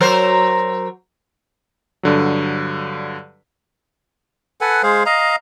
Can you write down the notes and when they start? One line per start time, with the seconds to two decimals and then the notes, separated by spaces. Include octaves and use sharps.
0.01 F#3 A#4 C5
2.03 G2 D3 F#3
4.61 A4 B4 F#5 G#5
4.83 G#3 G#4 C5 F5
5.06 D#5 F5 A#5